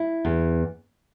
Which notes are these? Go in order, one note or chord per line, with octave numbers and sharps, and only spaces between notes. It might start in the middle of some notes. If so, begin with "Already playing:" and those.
Already playing: E4
E2